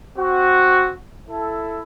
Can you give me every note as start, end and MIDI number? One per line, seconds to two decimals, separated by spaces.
0.17 0.92 60
0.17 0.92 66
1.29 1.81 64
1.29 1.81 69